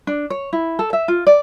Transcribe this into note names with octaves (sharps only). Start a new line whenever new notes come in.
D4
C#5
E4
A4
E5
F4
D5